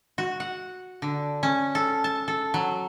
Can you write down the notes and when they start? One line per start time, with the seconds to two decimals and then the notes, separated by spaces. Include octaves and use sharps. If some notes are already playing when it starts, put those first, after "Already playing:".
0.18 F#4
0.40 F#5
1.02 D3
1.43 C#4
1.75 A4
2.04 A5
2.28 A4
2.54 F#3